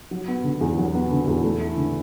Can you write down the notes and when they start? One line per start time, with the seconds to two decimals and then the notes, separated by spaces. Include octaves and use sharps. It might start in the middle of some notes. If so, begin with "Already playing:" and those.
0.11 F#3
0.28 B3
0.44 D3
0.61 E2
0.78 F#3
0.95 B3
1.11 D3
1.27 E2
1.44 A3
1.61 E4
1.77 D3